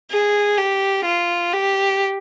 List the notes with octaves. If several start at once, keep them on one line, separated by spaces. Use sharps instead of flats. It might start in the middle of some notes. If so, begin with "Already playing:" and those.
G#4
G4
F4
G4